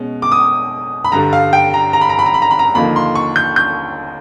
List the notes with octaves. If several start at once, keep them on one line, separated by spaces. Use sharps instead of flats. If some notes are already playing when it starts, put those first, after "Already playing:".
Already playing: B2 G#3 C#4
D6
D#6
B5
G2 D3 G3 A#5
F5
G5
A#5
A#5
B5
A#5
B5
A#5
B5
A#5
B5
A#5
D#2 D3 F3 A#3 D#4 B5
C6
C#6
G6
G6